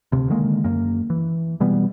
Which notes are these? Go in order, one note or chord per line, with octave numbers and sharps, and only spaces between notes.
D2 C3
D3 D#3 G#3 A#3
F#2 A#3
E3
B2 E3 G3 B3